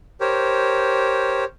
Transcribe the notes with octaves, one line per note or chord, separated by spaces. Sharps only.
G4 A#4 C5 C#5